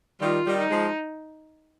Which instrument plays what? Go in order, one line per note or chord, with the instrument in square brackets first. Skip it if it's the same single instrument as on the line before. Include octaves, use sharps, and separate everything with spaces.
[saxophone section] D#3 G3 [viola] F4
[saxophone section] D#3 G3
[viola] D#4
[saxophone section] F3 G#3